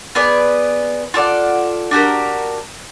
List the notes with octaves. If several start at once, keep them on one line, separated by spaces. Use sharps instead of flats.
B3 G#4 B4 D5
F4 A4 D5 F#5
D4 F#4 G4 A#4